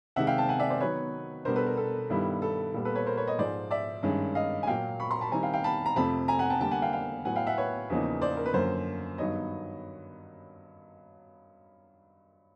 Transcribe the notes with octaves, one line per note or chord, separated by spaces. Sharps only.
C3 D#3 G#3 E5 F#5
F5 G5
G5 A5
F#5 G#5
D5 E5
C5 D5
D#3 F#3 B3 B4 C#5
B2 G3 B3 D4 A#4 C5
A4 B4
A#4
A4
G2 D#3 G3 B3 E4
A4
A#2 G3 B3 A4
A4 B4
B4 C#5
A#4 C5
B4 C#5
C#5 D#5
G#2 F3 G#3 C5 D5
D5 E5
G2 D#3 G#3 C#4
D#5 F5
G#5
A#2 F#3 A#3 F5 G5
B5 C#6
A#5 C6
A5 B5
D#3 G3 C4 E4 G#5 A#5
F5 G5
F5 G5
A5 B5
A#5
F2 C3 F3 A3 A5 B5
G#5 A#5
F#5 G#5
G5 A5
D3 G3 A#3 G5 A5
F#5 G#5
F5 G5
F5 G5
A2 F#3 B3 F#5 G#5
F5 G5
E5 F#5
B4 C#5
E2 C#3 F3 A#3 D#4
C5 D5
A#4
B4
F#2 D3 F3 A#3 A#4 C5
G2 D#3 F#3 B3 D#4 C#5 D#5